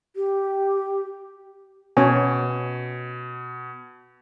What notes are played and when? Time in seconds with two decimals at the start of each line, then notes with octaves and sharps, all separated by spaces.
0.16 G4
1.97 B2 C#4 C#5 G#5